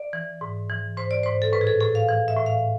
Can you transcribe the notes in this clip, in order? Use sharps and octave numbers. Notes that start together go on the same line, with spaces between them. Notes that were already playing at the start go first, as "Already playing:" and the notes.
Already playing: D5
E3
G#2
E3
G#2 C5
D5
G#2 C5
A4
A2 B4
G#4
A4
A2 A4
F5
E3 F5
E5
A2
F5